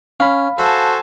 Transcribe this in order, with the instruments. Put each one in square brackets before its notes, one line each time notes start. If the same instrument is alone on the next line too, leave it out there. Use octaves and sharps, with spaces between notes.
[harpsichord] C#4 [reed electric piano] F5 B5
[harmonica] F#4 A4 C5 [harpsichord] E5 [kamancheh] G#5 A5